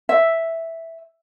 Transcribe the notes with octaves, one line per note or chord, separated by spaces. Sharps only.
E5